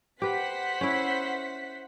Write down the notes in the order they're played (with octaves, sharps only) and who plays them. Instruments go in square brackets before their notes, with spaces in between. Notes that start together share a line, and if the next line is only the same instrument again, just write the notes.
[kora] G4 B4 [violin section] C5 F#5 B6
[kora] C#4 E4